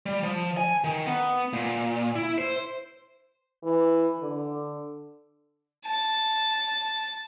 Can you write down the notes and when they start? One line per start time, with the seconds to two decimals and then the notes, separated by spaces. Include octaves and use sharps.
0.06 G3
0.23 F3
0.57 G#5
0.84 D#3
1.07 B3
1.53 A#2
2.16 E4
2.38 C5
3.64 E3
4.19 D3
5.85 A5